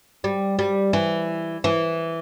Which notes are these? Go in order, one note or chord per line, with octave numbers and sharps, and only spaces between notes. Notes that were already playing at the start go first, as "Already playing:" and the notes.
G3
G3
E3
E3